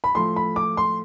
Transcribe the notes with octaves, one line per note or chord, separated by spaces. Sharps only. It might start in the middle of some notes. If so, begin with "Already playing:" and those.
B5
A2 F3 A3 C6
B5
D6
C6